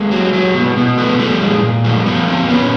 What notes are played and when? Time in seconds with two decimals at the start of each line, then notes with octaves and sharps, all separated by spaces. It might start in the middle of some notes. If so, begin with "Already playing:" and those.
Already playing: G#3 A#3
0.11 F#3
0.33 F#3
0.54 B2
0.77 B2
0.98 F3 A3 B3
1.19 F3 G3 A3
1.41 A#2 G#3
1.63 A#2
1.84 F3 G3 A3
2.06 F3 A3 B3
2.28 A#2 A#3 C4
2.49 A#2 B3 C#4